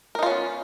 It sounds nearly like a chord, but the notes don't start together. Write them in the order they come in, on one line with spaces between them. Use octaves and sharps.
A#4 D#4 F4 C#4 B3